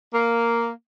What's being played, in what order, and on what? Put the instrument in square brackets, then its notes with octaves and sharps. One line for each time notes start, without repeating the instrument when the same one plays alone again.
[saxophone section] A#3